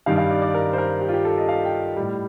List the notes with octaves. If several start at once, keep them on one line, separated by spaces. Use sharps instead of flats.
G2 D#3 G3 F5
F5
D5
D5
A#4
C5
A#4
G4
F4
G4
A4
D#5
F5
G5
A2 G3